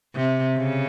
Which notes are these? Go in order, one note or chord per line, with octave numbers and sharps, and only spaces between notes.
C3
C#3